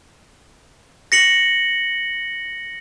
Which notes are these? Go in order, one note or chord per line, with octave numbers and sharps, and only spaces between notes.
A#6 C#7 F#7